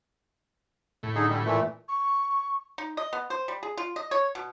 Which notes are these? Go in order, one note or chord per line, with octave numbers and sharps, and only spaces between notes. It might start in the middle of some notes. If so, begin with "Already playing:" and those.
A2
D3 D#4 G#4
D3 G3
A#2 E3 A3
C#6
D#4
D#5
B3
C5
G3
G#4
F4
D#5
C#5
B2